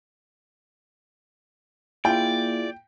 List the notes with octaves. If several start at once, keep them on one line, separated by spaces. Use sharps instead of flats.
A#3 E4 F4 G#4 D5 G5